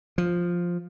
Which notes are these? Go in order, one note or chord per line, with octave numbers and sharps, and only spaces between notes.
F3